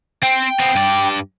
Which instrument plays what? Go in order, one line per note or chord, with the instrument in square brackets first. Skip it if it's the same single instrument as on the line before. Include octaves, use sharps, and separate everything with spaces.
[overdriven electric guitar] C4 [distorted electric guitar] G5
[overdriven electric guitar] B3 C4
G2 D5